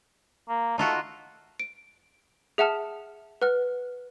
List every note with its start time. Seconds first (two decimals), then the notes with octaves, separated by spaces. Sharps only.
0.49 A#3
0.78 A3 D#4 F4 F#4
1.60 D7
2.58 G#4 E5 F#5 A5 F6
3.42 B4 F#5 F6